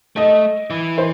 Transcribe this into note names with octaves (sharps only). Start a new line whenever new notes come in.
A3 D#5
E3
C5